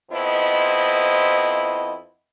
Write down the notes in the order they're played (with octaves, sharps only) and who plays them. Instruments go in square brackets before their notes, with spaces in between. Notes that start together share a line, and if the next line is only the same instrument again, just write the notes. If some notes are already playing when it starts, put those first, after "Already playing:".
[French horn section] F2 B3 E4 C5 D#5